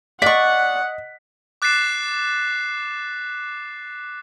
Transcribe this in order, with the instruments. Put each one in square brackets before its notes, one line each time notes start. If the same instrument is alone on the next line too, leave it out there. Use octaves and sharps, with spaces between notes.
[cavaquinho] D5 C#6 [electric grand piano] D#5 B6 [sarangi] F#5
[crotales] D6 F#6 A6 B6 C7 E7